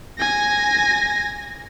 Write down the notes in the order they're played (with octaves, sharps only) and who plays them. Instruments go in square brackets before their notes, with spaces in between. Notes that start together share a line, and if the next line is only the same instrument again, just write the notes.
[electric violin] G#5 A#6